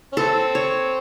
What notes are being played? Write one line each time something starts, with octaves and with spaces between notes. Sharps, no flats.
C#4
E3 C4 A4
C#5